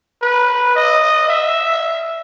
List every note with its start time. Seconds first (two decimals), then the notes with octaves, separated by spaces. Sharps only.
0.22 B4
0.75 D#5
1.28 E5